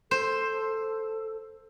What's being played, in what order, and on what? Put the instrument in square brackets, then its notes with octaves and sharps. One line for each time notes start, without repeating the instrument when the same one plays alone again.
[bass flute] A4 [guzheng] C5